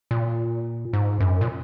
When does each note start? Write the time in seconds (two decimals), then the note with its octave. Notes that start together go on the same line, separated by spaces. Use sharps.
0.11 A#2
0.93 G#2
1.20 F#2
1.41 A#2